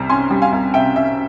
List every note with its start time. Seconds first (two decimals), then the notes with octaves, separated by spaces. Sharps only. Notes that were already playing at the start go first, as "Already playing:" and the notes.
Already playing: C2 C3 G3
0.09 C#4 G#5 C6
0.30 G3
0.42 F5 G#5
0.53 C2
0.74 C3 E5 G5
0.96 C#4 E5